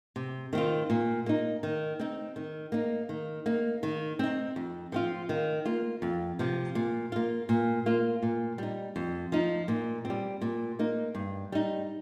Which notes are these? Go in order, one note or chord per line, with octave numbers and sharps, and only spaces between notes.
C3
D#3 C4 F4
A#2
A#3 D#4
D#3
C4 D#4
D#3
A#3 D#4
D#3
A#3 D#4
D#3
C4 D#4
F2
F3 C4 F4
D#3
A#3 F4
F2
C3 F3
A#2
A#3 F4
A#2
A#3 F4
A#2
G3 D#4
F2
F3 D#4
A#2
C4
G3
A#2
A#3 D#4
G2
G3 D#4